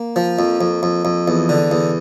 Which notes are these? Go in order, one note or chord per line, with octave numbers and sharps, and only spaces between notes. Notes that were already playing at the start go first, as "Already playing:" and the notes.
Already playing: A#3
F3
F2
F2
F2
F2
E2
D3
E2